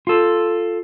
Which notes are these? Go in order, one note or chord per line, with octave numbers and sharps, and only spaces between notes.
F4 A4